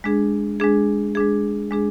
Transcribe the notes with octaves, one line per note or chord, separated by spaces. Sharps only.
G#3 D4 G#4
G#3 D4 G#4
G#3 D4 G#4
G#3 D4 G#4